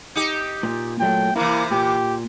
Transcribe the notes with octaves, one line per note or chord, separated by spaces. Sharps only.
D#4 G4
A#2
A#2 F#3 A3 G5
C3 E3 A#3 E4
A#2 G4